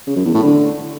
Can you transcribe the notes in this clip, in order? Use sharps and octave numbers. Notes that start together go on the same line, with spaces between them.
C#3
F#2
E2
A2
D3